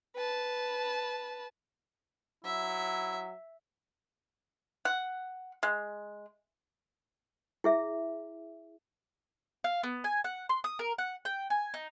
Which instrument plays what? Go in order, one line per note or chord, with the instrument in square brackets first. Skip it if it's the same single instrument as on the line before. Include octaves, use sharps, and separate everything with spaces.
[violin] B4 A5
[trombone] F#3 [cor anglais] E4 [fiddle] E5
[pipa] F#5
G#3
[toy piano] E4 G#4 E5
[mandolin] F5
B3
G#5
F#5
C6
D#6
A#4
F#5
G5
G#5
D#4